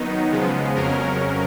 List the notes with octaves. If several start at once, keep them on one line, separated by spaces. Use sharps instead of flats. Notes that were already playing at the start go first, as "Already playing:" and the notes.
Already playing: D#3 F#3 B3 D#4
C#3 F3 G#3 B3
F2 C#3 F#3 C#4 A#4